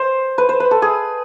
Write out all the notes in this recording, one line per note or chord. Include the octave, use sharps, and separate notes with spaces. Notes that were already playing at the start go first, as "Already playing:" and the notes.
Already playing: C5
B4
C5
B4
A4
G#4